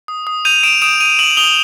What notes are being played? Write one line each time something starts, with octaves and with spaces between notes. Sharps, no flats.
D#6
D#6
G6 D#7 F7
D#6 D7 E7
D#6 D7 E7
D#6 D#7 F7
D#6 E7 F#7
D#6 F7 G7